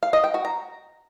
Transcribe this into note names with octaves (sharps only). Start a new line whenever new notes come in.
F5
D#5
G5
F#4
A#5